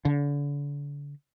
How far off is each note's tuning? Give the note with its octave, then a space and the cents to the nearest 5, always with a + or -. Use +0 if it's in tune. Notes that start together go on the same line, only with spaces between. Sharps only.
D3 -35